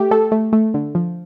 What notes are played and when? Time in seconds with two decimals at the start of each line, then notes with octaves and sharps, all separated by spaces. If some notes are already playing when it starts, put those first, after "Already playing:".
Already playing: A3 G4
0.11 A3 A4
0.32 A3
0.53 A3
0.74 D3
0.95 F3